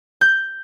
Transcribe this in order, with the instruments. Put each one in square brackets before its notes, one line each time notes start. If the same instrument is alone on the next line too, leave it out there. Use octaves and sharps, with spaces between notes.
[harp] G6